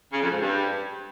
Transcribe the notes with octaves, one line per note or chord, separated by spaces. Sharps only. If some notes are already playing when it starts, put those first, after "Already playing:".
C#3
F2
G#2
G2